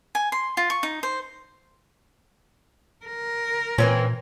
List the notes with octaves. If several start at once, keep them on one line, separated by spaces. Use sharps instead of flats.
G#5
C6
F4
C#6
D#4
C5
A#4
A#2 E3 C4 C#4